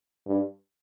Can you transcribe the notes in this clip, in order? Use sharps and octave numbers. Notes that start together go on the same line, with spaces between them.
G2